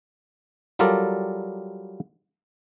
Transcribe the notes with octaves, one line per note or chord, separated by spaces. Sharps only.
F#3 G3 F4 A4 A#4 D5